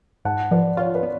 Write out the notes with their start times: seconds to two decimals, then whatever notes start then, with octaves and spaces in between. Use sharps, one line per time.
0.25 G#2 F#5 A5
0.51 F3 B4 D5
0.77 F4 C#5 F5
0.95 B4 D5
1.03 B3